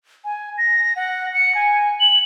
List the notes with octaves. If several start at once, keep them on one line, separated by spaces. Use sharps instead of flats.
G#5
A#6
F#5
C#7
G#5
F#7